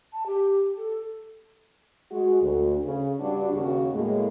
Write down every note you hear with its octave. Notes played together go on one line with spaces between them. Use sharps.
A5
G4
A4
G#3 F#4
D2
C#3
G2 D4 F#4
D#2 C#3 F#4
A2 G#3 A#3